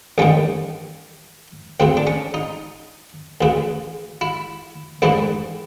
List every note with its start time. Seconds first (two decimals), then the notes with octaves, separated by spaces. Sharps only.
0.18 A1 G2 D#3 C#4
1.80 D2 C#3 E3 C4
1.97 D4
2.07 C#4
2.34 D#4
3.41 D2 C#3 E3
4.21 E4
5.02 A1 G#2 E3 E4